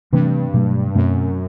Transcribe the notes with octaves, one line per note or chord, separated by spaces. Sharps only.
G2 C3 E3 A3 C4
B2 F#3 A3
F#2 B2 A3 C4